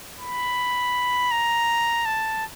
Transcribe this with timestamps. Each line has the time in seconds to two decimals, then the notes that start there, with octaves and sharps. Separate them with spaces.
0.20 B5
1.31 A#5
2.05 A5